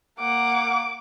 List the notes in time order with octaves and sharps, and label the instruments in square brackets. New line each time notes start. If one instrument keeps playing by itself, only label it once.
[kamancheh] A#3 F#5 [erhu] D6